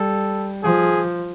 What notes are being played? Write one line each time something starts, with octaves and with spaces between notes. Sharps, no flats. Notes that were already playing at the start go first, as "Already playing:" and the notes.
Already playing: G3 A4
F3 G#4